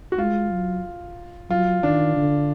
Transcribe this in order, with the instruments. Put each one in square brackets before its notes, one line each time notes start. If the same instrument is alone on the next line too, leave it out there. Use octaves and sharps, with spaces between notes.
[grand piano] F#4
[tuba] G#3 [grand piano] F4
[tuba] F#3
[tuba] F#3 [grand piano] F4
[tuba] D#3 [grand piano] D4
[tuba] D3